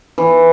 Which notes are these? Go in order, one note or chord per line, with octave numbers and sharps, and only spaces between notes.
E3